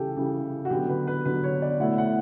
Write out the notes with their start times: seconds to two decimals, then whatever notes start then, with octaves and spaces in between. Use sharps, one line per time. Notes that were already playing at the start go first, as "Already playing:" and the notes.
Already playing: C#3 E3 G3 G4 A4
0.17 C#3 E3 G3 G4
0.65 F#4
0.70 D3 F#3 B3 G4
0.89 B4
1.07 B4
1.25 D3 F#3 B3 B4
1.43 C#5
1.62 D5
1.79 B2 A3 E4 F#5
1.98 F#5